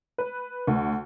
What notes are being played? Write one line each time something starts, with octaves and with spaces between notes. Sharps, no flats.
B4
D2